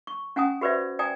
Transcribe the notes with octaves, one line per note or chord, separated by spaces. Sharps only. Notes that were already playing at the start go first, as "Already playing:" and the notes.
C#6
C#4 F#5 G#5 A#5 D#6
F#4 G4 B4 C5 D5 E5
D5 G5 G#5 A#5 D#6